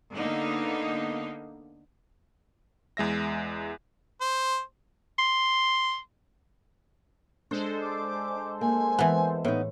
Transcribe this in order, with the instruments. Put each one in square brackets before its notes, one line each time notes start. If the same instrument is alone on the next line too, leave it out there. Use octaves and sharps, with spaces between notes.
[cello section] D3 A#3 B3 D#4
[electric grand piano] E2 G#3 E5 A#6
[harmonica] C5
[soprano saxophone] C6
[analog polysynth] G#3 A4 C5 [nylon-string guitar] D4
[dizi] D6
[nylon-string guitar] A#3 [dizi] G#5
[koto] E3 B3
[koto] A2 [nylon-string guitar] B3 D#4